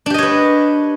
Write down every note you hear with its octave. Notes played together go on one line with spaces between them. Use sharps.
D4 G4 B4 C#5 D#5